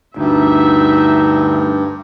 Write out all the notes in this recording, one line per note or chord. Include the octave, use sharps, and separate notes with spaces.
D2 G2 D#4 E5